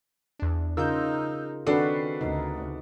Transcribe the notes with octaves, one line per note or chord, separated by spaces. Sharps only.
E2 D4
C#3 D#4 F4 A#4 E6 G6
D#3 C4 D4 F#4 A4 B4 C7
D2 C#3 D#4